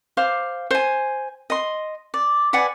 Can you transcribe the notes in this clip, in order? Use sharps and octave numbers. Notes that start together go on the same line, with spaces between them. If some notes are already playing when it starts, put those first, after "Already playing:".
C5 F5 D6
C5 G#5
D#5 C6
D5
B4 D5 F#5 G#5